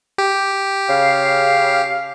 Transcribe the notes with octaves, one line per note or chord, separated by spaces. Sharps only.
G4
C#3 F5